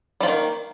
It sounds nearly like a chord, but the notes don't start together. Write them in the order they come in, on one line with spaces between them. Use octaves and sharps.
G3 F3 A#3 D#3